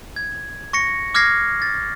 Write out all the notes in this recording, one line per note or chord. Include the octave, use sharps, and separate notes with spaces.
G#6
C#6 A#6 C#7
D6 F6 G#6 A#6 C7
A6